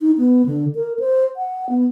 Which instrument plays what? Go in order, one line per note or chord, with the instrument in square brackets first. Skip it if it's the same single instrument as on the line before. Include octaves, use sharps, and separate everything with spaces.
[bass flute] D#4
B3
D3
A#4
C5
F#5
B3